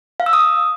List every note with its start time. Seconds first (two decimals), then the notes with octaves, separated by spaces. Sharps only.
0.20 F5
0.26 E6
0.33 D#6